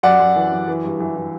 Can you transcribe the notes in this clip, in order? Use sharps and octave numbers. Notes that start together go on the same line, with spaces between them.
F#2 D5 F#5
F#2
E3
F#2
E3
G2
E3
E3